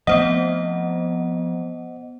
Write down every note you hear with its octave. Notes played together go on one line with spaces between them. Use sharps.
F3 A3 B3 C4 C5 D#5 F#5